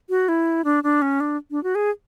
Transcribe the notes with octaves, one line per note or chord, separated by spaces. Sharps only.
F#4
E4
D4
D4
C#4
D4
D4
F#4
G#4